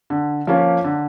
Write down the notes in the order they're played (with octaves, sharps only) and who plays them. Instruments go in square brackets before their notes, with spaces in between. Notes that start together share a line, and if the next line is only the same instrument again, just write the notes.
[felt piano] D3
F3 A#3 C#4
D3